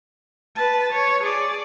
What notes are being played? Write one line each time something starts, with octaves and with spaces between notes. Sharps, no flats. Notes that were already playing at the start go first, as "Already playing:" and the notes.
B4 A5
C#5
G#4 D5